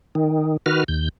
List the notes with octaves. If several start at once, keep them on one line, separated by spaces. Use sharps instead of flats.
D#3
D#3 F#4 B4 F6
D#2 G6